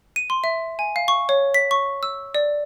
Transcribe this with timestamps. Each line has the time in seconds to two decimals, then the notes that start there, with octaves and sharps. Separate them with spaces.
0.16 D#7
0.30 C6
0.44 E5
0.79 G#5
0.96 F5
1.08 C#6
1.29 C#5
1.54 B6
1.71 C#6
2.03 E6
2.35 D5